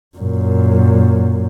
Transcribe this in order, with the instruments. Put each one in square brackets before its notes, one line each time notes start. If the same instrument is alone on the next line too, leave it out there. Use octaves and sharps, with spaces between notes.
[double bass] F#2 A#2